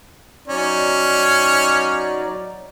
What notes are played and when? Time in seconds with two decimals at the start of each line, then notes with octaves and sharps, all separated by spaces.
0.48 F#3 C#4 D#4 D5